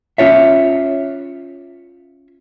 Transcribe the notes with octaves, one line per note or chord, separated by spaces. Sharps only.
C#4 F4 C#5 E5